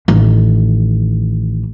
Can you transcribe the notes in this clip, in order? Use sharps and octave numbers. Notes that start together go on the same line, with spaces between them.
A1 D#3